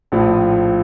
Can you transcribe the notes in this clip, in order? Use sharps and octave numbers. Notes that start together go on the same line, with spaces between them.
A#1 A2 F3